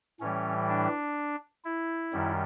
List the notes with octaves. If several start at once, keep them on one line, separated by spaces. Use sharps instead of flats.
A2 E3 G3 C#4
D4
E4
F#2 D#3 G3